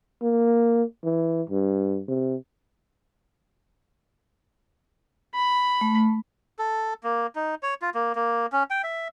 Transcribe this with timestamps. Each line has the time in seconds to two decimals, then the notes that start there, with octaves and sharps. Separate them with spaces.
0.22 A#3
1.04 E3
1.49 G2
2.08 C3
5.35 B5
5.81 A3
6.59 A4
7.03 A#3
7.35 D#4
7.63 C#5
7.82 F4
7.95 A#3
8.15 A#3
8.52 C#4
8.70 G5
8.84 E5